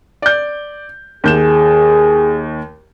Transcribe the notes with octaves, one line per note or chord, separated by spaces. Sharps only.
D5 G6
D#2 G#4 G6 E7